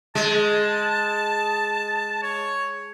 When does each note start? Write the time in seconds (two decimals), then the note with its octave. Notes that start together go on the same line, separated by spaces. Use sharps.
0.15 G#3 A5
2.22 C#5